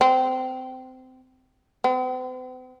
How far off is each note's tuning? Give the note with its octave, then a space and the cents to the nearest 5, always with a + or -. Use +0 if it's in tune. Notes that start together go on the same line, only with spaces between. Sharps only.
C4 -20
C4 -45